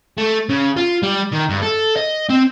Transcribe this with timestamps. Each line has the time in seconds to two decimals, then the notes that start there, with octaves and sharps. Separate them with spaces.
0.18 A3
0.49 C#3
0.77 F4
1.03 G3
1.33 D#3
1.50 G2
1.63 A4
1.97 D#5
2.29 C4